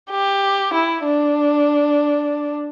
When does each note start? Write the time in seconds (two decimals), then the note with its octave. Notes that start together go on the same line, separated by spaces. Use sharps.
0.11 G4
0.73 E4
1.04 D4